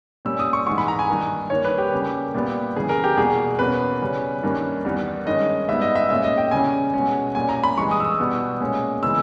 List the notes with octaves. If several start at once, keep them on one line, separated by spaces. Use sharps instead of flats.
A#2 G3 C#4 E6
D#6
C#6
G#2 E3 G#3 C#6
B5
A#5
G#5
G2 D#3 A#3
G2 D#3 A#3 C#5
B4
G4
C#3 G3 A#3 C#4
A#2 G3 B3
C#3 E3 G3 G#4
A#4
G4
E2 B2 G3 A#3 G#4
E2 B2 A#3 C#4 B4
C#3 G3 C#4
G2 D#3 A#3 C#4
E2 D#3 G3
G2 D#3 G#3 C#4 D#5
G#2 G3 B3 E5
D#5
E5
A#2 G#3 C#4 E5
D#5
G5
E2 C#3 G3 C#4 G#5
B2 G#3 C#4
A#2 G3 C#4 G#5
A#5
B5
G2 E3 G#3 C#6
D#6
E6
D#6
B2 G3 B3
A#2 G#3 C#4
C#3 E3 G#3 B3 E6